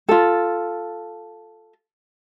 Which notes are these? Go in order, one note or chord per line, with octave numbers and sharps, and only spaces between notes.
F4 A4